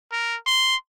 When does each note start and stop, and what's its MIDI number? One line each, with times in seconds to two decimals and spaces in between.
0.12 0.36 70
0.46 0.76 84